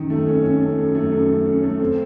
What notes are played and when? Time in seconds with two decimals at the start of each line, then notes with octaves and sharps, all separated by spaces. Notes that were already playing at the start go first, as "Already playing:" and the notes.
Already playing: F#2 D#3
0.10 A3
0.27 C#4
0.44 C#4
0.61 A3
0.78 F#2
0.95 A3
1.12 F#2
1.29 A3
1.46 C#4
1.63 A3
1.80 C4